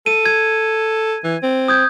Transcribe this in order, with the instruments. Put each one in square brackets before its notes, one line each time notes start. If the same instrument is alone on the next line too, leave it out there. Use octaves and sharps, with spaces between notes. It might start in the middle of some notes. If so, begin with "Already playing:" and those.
[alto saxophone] A4 [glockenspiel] D#7
[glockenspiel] G#6
[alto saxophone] E3
C4
[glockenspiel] D#6 G6 G#6